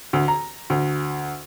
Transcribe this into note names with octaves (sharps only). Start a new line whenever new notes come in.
D2
A#5
D2